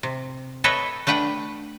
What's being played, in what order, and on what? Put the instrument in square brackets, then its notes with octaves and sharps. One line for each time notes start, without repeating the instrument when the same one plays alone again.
[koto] C3
A4 B4 C#5 D#5 E5 G5
A3 D4 B4 F#5 G5